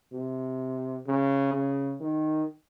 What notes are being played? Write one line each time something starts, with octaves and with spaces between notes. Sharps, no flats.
C3
C#3
C#3
D#3